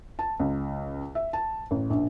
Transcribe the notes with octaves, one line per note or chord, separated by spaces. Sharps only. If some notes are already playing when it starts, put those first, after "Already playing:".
A5
C#2
E5
A5
A1
A#1